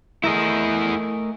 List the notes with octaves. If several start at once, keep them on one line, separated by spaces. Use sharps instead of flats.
A3 E4 G#4 A#4 D#5